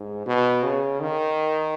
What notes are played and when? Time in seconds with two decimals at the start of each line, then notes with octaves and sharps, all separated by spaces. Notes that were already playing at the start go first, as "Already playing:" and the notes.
Already playing: G#2
0.26 B2
0.63 C#3
1.01 D#3